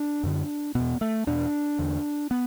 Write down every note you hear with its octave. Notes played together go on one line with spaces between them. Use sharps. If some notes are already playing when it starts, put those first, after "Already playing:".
Already playing: D4
F#2 D3
E2 B2 B3
A3
E2 B2 D4
E2 D3
B3